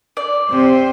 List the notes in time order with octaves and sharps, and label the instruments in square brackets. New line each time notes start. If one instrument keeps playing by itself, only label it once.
[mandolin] D5
[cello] C3 C5